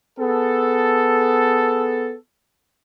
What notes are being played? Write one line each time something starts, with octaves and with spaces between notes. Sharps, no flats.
B3 G#4 A4